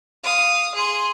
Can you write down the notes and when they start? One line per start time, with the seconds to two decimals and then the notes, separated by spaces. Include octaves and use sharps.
0.24 F5 D#6
0.75 G#4 C6